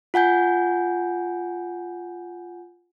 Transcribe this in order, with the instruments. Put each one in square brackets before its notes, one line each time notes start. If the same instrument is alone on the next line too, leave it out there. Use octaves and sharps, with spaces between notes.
[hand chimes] F4 F#5 G#5 G6